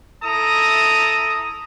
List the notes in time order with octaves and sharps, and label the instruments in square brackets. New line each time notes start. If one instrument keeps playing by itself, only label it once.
[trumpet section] E4 A4 A#5 D#6